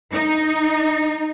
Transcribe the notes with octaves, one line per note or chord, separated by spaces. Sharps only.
D#4